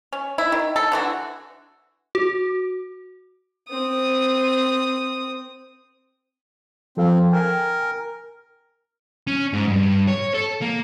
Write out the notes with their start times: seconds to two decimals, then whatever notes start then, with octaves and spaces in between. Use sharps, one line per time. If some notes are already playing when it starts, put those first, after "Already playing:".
0.13 C#4
0.38 E4
0.52 D#3
0.76 A4
0.92 D3 E3 F#4
2.15 F#4
3.69 C4 D#6
6.97 F3 C4 A4 F5
7.33 A#4 G5 G#5
9.27 C#4
9.53 G#2
9.68 G2
10.08 C#5
10.34 A4
10.62 A#3